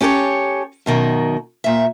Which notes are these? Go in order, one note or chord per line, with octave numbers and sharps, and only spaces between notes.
C#4 G4 A4 B4 C#5
F#2 B2 D#3
A#2 E5